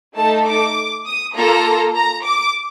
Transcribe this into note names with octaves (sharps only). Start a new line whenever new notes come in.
A3 D#4 A4 A5
D6
D#6
A#3 F4 A4 A#5
A#5
D6